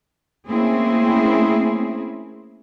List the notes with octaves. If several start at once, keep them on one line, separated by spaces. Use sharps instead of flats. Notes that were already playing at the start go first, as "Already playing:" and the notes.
A3 A#3 C4 C#4 E4 G#4